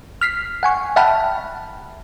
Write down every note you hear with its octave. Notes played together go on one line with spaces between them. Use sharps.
F6 B6 C7
F#5 G#5 C#6
E5 F#5 G5 A5 B5 F6